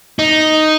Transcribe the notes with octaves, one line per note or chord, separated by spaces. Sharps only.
D#4